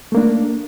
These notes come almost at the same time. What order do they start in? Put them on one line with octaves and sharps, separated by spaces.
A3 A#3 D4